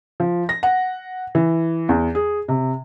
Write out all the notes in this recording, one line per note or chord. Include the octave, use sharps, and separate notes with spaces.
F3
A#6
F#5
E3
E2
G#4
C3